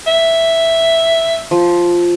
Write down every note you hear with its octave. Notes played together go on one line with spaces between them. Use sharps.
E5
F3